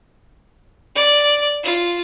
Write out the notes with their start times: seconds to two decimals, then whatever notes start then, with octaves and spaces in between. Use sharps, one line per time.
0.95 D5
1.63 F4